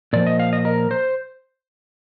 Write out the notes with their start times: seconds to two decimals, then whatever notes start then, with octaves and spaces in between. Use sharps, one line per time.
0.13 A#2 F3 D5
0.27 D#5
0.40 F5
0.53 D#5
0.65 A#4
0.91 C5